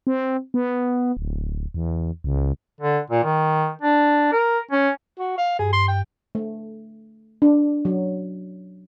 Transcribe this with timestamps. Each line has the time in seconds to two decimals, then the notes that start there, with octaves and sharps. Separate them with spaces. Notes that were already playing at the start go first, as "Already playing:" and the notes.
0.07 C4
0.54 B3
1.17 D1
1.74 E2
2.24 C#2
2.81 D3
3.10 A#2
3.24 D#3
3.82 D4
4.32 A#4
4.71 C#4
5.19 F#4
5.38 F5
5.59 G2 G#4
5.73 C6
5.88 G5
6.35 A3
7.42 D4
7.85 F#3